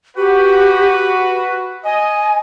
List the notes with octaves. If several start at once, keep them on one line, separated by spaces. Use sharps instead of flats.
F#4 G4 B4 F#5
D#5 G#5